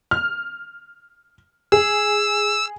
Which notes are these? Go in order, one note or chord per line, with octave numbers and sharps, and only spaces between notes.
F6
G#4 E6